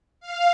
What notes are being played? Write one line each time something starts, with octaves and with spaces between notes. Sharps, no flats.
F5